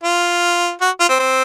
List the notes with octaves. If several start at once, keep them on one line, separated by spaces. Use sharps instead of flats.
F4
F#4
F4
C4
C4